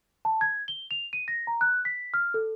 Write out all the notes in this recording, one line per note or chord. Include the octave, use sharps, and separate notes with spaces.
A5
G#6
G7
F7
D#7
A#6
A#5
F#6
B6
F6
A4